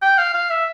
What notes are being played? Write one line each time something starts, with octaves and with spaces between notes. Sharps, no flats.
G5
F5
F5
E5